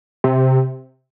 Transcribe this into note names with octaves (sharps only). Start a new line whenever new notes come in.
C3